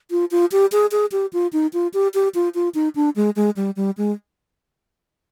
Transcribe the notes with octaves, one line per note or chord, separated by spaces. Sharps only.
F4
F4
G4
G#4
G#4
G4
F4
D#4
F4
G4
G4
F4
F4
D#4
D4
G#3
G#3
G3
G3
G#3